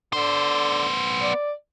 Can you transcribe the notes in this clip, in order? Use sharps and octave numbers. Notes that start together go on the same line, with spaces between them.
D3 B3 C5
D5